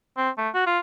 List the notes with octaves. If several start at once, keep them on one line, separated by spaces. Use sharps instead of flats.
C4
A3
F#4
F4